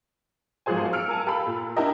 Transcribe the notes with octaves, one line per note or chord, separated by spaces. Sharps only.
G#1 F3 F#3 G#4 C5 G#5
E6 F6 C#7 D7 F7
A#4 G#5 A5
G4 A4 A#4 F5 B5
A#2
D4 E4 G4 A#4 D#5